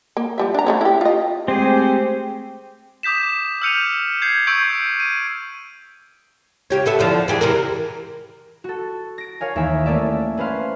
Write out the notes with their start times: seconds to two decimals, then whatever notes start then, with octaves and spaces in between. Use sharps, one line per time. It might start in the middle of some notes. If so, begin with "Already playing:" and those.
0.17 A#3
0.38 F3 G3 E5
0.54 D4 A#5
0.66 A3 B3 C#4
0.81 E4 G4
1.01 F4 D#5
1.48 G#3 A3 C4 G4 G#4 C5
3.03 D6 D#6 G6 B6 E7
3.62 E6 F6 G6 C#7 D#7 F7
4.22 G6 G#6 C7
4.47 C#6 E6 G6 G#6 C7 D7
5.00 D#7
6.70 C#3 G4 C#5
6.86 B3 A4 E5
6.99 E2 D3 F3
7.28 E3 G4 G#4
7.41 C3 E3 A#4
8.64 F#4 A4
9.18 A#6 D7
9.40 A#4 C#5 F5 G#5
9.56 D#2 E3 E5 G#5 B6 E7
9.86 A3 A#3 C#4 D5 E5
10.38 C#4 B4 C5 F5 C6